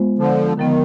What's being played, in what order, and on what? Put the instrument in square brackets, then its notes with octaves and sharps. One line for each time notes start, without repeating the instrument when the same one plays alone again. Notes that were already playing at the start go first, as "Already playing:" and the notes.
Already playing: [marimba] G#3 B3 F4 C5
[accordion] D3 F3
[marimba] D3 F3 B3 [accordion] D#3